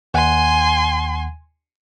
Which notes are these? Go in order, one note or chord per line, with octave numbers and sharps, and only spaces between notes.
D#2 F#5 G#5 C6